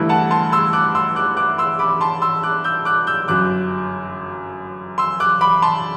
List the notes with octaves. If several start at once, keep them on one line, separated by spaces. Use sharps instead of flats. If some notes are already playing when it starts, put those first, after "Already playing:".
Already playing: G1 G2 E3 A3 E4
F#5 A5
A5 C6
C6 E6
D6 F#6
C6 E6
D6 F#6
D6 F#6
C6 E6
B5 D6
A5 C6
C6 E6
D6 F#6
E6 G6
D6 F#6
E6 G6
G1 F#2 F#3 D6 F#6
C6 E6
D6 F#6
B5 D6
A5 C6